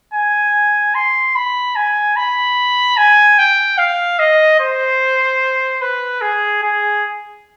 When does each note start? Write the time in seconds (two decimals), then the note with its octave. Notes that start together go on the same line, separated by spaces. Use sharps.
0.14 G#5
0.95 C6
1.36 B5
1.76 G#5
2.16 B5
2.98 G#5
3.39 G5
3.78 F5
4.19 D#5
4.60 C5
5.82 B4
6.22 G#4
6.63 G#4